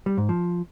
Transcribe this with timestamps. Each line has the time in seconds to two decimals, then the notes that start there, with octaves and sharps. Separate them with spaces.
0.06 G3
0.18 G#2
0.29 F3